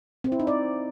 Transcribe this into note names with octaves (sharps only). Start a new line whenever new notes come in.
C4
E4
D#4
D5